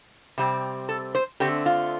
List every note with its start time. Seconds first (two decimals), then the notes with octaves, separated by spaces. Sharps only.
0.38 C3 G3 C4
0.89 A4
1.15 C5
1.40 D3 A3 C4 G4
1.66 F4